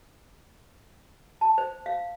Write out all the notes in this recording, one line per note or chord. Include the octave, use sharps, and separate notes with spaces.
A5
C5
F5